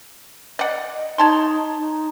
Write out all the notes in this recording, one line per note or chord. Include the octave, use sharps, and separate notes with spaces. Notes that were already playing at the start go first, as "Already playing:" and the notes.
D5 D#5 F#5
D#4 C#5 A5 C6
D#4